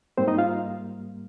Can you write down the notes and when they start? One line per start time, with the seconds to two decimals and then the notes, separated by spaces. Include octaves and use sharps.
0.17 G#2 G3 A#3 C4 C5
0.28 D#4 D#5
0.38 F4 F5